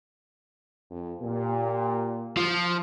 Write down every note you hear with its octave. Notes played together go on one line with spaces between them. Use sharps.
F2
A#2 G4
F3